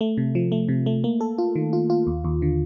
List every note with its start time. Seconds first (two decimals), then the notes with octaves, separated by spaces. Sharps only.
0.01 A3
0.17 C3
0.35 F3
0.52 A3
0.68 C3
0.86 A3
1.04 A#3
1.21 A4
1.38 F4
1.56 D#3
1.73 F4
1.90 F4
2.07 D#2
2.24 D#2
2.42 D3